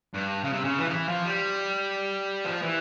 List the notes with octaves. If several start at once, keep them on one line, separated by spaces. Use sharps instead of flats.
G2
C#3
C3
C#3
E3
C#3
E3
F3
G3
F3
E3